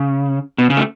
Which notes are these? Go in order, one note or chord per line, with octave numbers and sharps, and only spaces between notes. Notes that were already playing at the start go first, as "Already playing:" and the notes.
Already playing: C#3
B2
C#3
A3